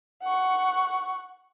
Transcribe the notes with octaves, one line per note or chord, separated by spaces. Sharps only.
F#5 C#6